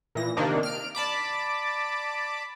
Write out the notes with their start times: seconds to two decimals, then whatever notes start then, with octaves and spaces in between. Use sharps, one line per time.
0.15 A#2 E3 A#6
0.37 C3 D#3 A#3 D4 D#4
0.63 F6 D7
0.95 D5 A5 B5 D6